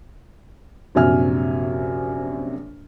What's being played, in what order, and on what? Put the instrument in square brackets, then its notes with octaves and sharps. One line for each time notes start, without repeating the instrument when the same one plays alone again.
[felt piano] A#1 F#2 C3 E5 G#5 F6